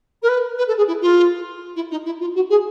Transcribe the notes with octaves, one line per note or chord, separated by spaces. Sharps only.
A#4
B4
B4
A4
G#4
E4
F4
E4
D#4
E4
F4
F#4
G#4